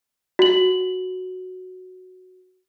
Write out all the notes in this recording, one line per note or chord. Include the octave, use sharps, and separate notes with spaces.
F#4 F#7